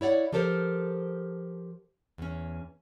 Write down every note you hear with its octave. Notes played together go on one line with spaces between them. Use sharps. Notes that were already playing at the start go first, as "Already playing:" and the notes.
E4 C#5 D5 F#5
F3 G4 A4 A#4 C5
E2 C#4